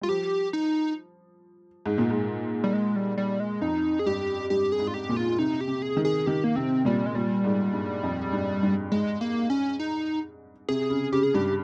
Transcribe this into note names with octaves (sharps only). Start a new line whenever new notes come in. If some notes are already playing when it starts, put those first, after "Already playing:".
G3 F4
F3 G4
D#4
G#2
A#2
G#2
G3
G#3
G3
G3
G#3
F2 D#4
G#4
G2 G4
G2 G4
G#4
G#2
F4
G4
A#2
F4
C3 D#4
G4
C3
G#4
D#3
G#4
D#3 G4
A#3
C3 C4
A#2 G3
G#3
A#2 G3
G#2
G2
F2
G2
G2
G#2 G#3
A#3
C#4
D#4
C3 G#4
C#3
C#3 G4
G#4
G2 G4